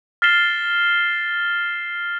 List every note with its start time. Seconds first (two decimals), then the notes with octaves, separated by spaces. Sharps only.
0.22 F6 A6 B6 C7 E7 G7